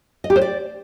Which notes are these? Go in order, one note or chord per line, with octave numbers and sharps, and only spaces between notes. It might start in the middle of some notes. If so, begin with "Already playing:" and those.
D#5
G4
C5
D5